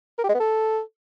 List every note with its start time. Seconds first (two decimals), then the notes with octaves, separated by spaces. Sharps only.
0.18 A#4
0.24 G4
0.29 G#3
0.34 B3
0.40 A4